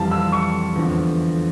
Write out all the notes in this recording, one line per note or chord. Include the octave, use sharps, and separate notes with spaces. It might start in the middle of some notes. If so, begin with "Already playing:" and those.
Already playing: F2 E3 G3 F5 A5
E6
C#6
E2 D3 F3